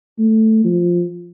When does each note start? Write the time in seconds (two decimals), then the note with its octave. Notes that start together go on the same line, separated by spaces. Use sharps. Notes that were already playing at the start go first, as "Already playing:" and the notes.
0.19 A3
0.64 F3